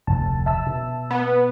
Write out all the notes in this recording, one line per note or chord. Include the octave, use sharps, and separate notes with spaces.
F1 D2 A5
E5 A5 E6
B2
B3